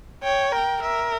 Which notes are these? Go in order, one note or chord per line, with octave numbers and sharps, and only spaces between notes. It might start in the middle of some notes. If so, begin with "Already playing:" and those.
C#5 G5
A#4 G5
A#4 E5